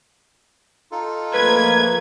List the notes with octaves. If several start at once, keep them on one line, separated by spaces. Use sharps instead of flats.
D#4 F4 A4
F3 A3 A#3 B4 G#6